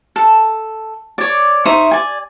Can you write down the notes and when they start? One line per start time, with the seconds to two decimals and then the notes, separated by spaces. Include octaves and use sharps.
0.16 A4
1.18 C#5 D5
1.65 D#4 C5 E5 C#6
1.91 D5 G#5